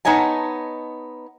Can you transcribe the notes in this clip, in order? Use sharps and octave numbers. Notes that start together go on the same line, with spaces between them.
B3 D#4 C#5 D#5 G#5 A5